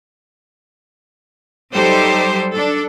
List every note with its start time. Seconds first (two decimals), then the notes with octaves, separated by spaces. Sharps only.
1.72 F#3 G3 D#4 G4 A4 C5
2.53 D4 A4